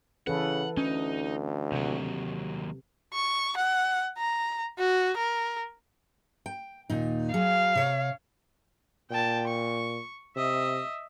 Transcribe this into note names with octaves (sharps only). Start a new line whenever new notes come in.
C#3 E3 A4 B4 F#5
D2 C#4 D#4
D#2 C3 F#3
C#6
F#5
A#5
F#4
A#4
G5
D#2 A#2 D#4
F#3 G#4 F5
C3 C#5
A#2 G5 A5
C#6
C3 D#5 E5